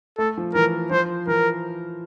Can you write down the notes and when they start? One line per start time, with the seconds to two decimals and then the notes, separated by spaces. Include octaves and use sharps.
0.18 A3 A4
0.37 F3
0.54 E3 A#4
0.91 F3 C5
1.27 E3 A#4